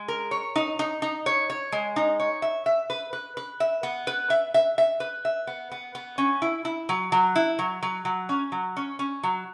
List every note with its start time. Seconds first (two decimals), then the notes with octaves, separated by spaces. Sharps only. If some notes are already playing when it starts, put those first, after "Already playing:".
Already playing: G#3
0.08 A#4
0.31 C#5
0.56 D#4
0.79 D#4
1.02 D#4
1.26 C#5
1.50 C#5
1.72 G#3
1.96 D#4
2.20 C#5
2.42 E5
2.66 E5
2.90 B4
3.13 B4
3.37 B4
3.60 E5
3.83 B3
4.07 B4
4.30 E5
4.54 E5
4.78 E5
5.00 B4
5.25 E5
5.47 B3
5.71 B3
5.95 B3
6.18 C#4
6.42 E4
6.65 E4
6.89 F#3
7.12 F#3
7.36 E4
7.59 F#3
7.83 F#3
8.05 F#3
8.29 C#4
8.52 F#3
8.77 C#4
8.99 C#4
9.23 F#3